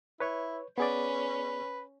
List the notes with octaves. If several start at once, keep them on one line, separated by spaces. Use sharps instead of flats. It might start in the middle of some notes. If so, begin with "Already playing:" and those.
E4 B4 C#5
B3 C#4 G#4 B4 D5